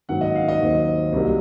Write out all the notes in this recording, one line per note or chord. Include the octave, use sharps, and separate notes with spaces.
G#2 D#3 F#3 A#3 C#4 F#5
D#5
F5
D#5
D#2 D#3 F#3 C4
C2 C3 F#3 A#3